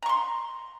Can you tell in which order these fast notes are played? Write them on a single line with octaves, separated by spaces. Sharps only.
A#5 C#6 C6